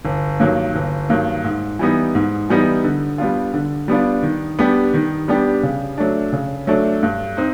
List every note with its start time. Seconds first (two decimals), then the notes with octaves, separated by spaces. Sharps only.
0.05 G1
0.40 G2 D#3 F#3 A#3
0.75 G1
1.09 G2 D#3 F#3 A#3
1.44 G#2
1.79 E3 G3 B3 D#4
2.15 G#2
2.49 E3 G3 B3 D#4
2.84 D3
3.18 G3 B3 D4 F4
3.54 D3
3.88 G3 B3 D4 F4
4.23 D#3
4.59 G3 B3 D4 G4
4.94 D#3
5.28 G3 B3 D4 G4
5.63 C#3
5.98 F#3 A3 D4
6.33 C#3
6.67 F#3 A3 D4
7.03 G2
7.37 C4 D#4